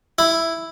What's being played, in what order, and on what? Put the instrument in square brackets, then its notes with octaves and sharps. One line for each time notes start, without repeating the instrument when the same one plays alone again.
[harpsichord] E4